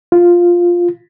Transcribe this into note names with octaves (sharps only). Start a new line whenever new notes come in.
F4